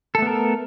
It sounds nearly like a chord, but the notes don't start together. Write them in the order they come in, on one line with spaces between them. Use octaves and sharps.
A4 A3 B3 A#4